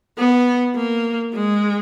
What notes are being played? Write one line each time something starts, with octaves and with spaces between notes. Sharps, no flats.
B3
A#3
G#3